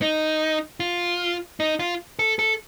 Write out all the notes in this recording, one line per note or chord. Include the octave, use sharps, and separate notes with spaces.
D#4
F4
D#4
F4
A4
A4